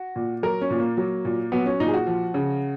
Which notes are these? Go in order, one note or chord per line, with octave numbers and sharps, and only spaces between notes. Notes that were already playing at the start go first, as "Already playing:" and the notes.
Already playing: F#4
A#2
F#3 A#4
C#4
A#2
A#3
F#3
A#2
F#3 B3
C#4
A#2 D#4
G#4
F#4
F3
C#3